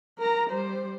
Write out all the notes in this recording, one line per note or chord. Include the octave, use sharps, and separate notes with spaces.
A#4 A#5
G3 C5